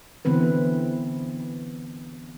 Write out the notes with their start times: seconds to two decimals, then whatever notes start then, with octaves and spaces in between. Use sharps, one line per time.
0.25 D3 E3 B3 C4 B4